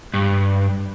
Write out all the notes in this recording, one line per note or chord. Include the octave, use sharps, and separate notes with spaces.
G2